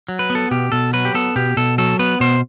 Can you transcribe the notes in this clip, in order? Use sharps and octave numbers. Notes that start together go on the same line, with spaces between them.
F#3
B4
B3
A4
B2 G4
B2 A4
F#3 B4
G4
B3 A4
B2 G4
B2 A4
F#3 A4
B3 B4
B2 C5